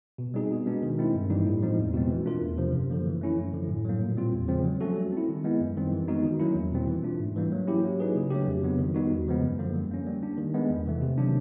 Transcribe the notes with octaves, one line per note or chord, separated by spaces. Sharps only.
B2
G3 C4 D#4 G#4
B2
G#3 B3 D4
D#3
G#3 C4 E4
G2
E3 G3 A#3 D#4
A2
F3 G#3 C4 D#4
E2
B2 G#3 C4
E3
A3 D4 F4 A#4
E2
C3 F3
F#2
D3 F3 A#3
E3
A3 C#4 E4
F#2
D3 F3
A2
F#3 A#3
A#2
G3 C4 F4
E2
C#3 F3 G#3 C4
F#3
A3 C#4 F#4 A4
G3
C4 E4
D#3
G#3 B3 E4
F#2
D#3 G3 C4
E3
G#3 B3 D#4 F#4
D#3
F#3 A#3 C#4 E4
E2
B2 G3 C4
E3
A3 D4 F4
G#2
E3 G3 A#3
F#3
A#3 C#4 E4 G4
F#3
A#3 D#4 G#4 B4
C#3
F#3 A3 D4 G4
F2
C#3 F#3 B3
D#3
G3 B3 D#4 F#4
E2
C#3 F3 G#3 B3
F#2
D3 F3 A#3
G3
A#3 C#4
G3
A#3 D4
D#3
G#3 B3
E2
C3 E3 A3
C3
D#3 F#3 A#3 D4